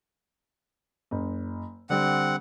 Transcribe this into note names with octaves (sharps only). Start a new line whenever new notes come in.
F#1
D3 G3 C4 F#5